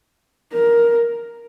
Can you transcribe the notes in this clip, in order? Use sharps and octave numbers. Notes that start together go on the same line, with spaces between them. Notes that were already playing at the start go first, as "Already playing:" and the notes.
A#4